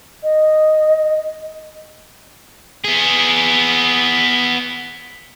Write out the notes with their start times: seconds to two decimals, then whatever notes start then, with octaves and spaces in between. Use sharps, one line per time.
0.23 D#5
2.84 B3 G#4